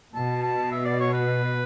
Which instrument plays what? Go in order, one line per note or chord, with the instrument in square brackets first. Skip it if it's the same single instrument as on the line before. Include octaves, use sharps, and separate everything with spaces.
[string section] B2 [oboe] A5
[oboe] A5
E5
D5
C#5
B4